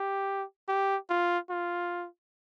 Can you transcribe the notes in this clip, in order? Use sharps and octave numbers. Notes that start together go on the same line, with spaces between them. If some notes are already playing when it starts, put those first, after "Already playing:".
Already playing: G4
G4
F4
F4